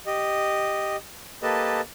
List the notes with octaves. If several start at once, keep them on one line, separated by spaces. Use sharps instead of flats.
G4 D#5
A#3 G4 A4 B4 D#5 A5